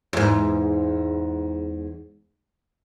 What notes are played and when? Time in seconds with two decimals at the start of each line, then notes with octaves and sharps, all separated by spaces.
0.13 E2 G#2